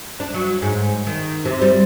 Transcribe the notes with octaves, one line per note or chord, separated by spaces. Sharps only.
D4
F#3
G#2
D#3
C3
G3